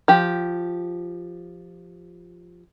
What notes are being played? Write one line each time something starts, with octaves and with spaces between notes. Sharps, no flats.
F3 G4